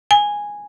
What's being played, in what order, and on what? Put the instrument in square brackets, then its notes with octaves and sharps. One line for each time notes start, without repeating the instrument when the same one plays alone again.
[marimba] G#5